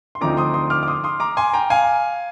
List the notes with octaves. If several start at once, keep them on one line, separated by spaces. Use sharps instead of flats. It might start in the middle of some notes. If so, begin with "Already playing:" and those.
C6
D2 D3 F3 C4 D#4 A#5 D6
C6 D#6
C6 D#6
D6 F6
D6
C6 D#6
C6 D#6
A#5 D6
G#5 C6
G5 A#5
F5 G#5